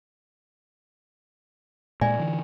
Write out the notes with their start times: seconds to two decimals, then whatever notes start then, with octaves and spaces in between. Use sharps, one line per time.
2.01 A#2 G#3 D5 E5 G#5
2.19 D3 E3